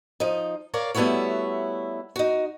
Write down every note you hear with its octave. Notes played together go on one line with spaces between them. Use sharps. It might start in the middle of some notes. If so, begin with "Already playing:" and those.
F3 D#4
A#4 C#5 D5 F5
G3 A3 B3 E4 F#4 C#5
D#4 F#4